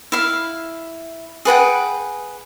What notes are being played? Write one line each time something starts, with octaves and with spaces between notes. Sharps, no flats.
E4 F5
G#4 B4 F#5 G5